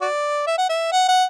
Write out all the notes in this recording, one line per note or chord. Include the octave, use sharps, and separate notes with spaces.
F#4 D5
E5
F#5
E5
F#5
F#5